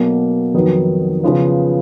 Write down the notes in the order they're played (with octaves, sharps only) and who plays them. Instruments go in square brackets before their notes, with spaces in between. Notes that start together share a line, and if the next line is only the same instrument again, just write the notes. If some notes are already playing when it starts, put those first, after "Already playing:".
Already playing: [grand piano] B1 B2 A#3
F2 D#3 F#3 B3 D#4
C#3 F3 B3 F4 B4